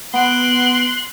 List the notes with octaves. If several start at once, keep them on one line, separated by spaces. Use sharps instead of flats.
B3 C6 F#6 D7